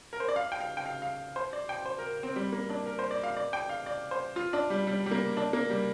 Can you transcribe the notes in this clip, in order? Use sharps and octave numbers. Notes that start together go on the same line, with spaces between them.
A#4
C5
D5
F5
G5
F5
G5
F5
F5
C5
D5
G5
C5
A#4
C4
G3
A#3
D4
A#4
C5
D5
F5
D5
G5
F5
D5
C5
F4
D4
G3
G3
G3
A#3
D4
A#3
G3